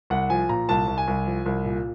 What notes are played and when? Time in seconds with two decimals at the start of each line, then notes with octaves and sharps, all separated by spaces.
0.10 C2 F#5
0.30 F3 G#5
0.49 A#2 A#5
0.69 C2 A5
0.88 C2
0.98 G#5
1.08 C2
1.27 F3
1.46 C2
1.65 A#2